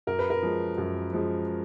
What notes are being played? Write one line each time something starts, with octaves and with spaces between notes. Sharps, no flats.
F#2 A#4
B4
A#4
F3 G#3
F#2
F3 G#3